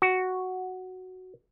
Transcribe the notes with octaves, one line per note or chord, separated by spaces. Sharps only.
F#4